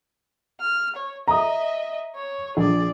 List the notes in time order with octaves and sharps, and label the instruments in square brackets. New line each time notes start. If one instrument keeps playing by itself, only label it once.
[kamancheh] F6
C#5
[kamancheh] D#5 E5 [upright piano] A#5 D#6
[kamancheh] C#5
[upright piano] A#1 [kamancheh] G#4 D5